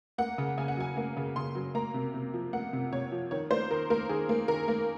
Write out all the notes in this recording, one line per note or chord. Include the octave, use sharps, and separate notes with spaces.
A#3 F#5
C#3
C#3 G#5
F#5
F#3 G#5
A#3
C#3
C#3 C6
F#3
A#3 A#5
C3
C3
F3
A#3 F#5
C3
C3 C#5
F3
D#3 C#5
A#3 C5
D#3 A#4
A#3 A#4
D#3 G#4
A#3
D#3 A#4
A#3